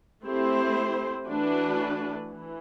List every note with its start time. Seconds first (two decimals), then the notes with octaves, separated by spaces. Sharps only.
0.24 A3 C4 E4 G4 C5
1.27 E3 A3 D4 F#4 B4
2.30 E3